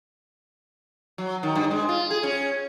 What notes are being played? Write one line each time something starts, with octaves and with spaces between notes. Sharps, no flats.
F#3
D#3
G2
G#3
F4
G#4
C#4